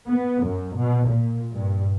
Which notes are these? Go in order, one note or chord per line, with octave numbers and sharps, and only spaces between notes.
B3
F#2
B2
A#2
G2